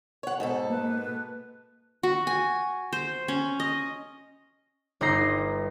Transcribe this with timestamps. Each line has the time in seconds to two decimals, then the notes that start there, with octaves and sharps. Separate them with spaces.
0.23 C#5 F#5
0.40 G#2 B2 A4
0.70 A#3 B4
2.03 F#4
2.27 G#5
2.93 C5
3.28 C#4
3.60 D#5
5.01 G1 G2 D#4 A#5 C7